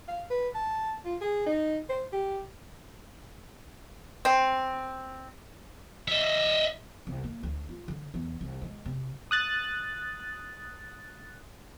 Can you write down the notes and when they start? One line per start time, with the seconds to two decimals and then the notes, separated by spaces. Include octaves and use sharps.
0.08 F5
0.30 B4
0.55 A5
1.05 F4
1.21 G#4
1.46 D#4
1.89 C5
2.13 G4
4.25 C4
6.08 D#5 E5
7.07 C2
7.24 A#3
7.43 D2
7.69 F4
7.88 D3
8.14 E2
8.41 C2
8.62 G#3
8.86 C3
9.31 D#6 F#6 A6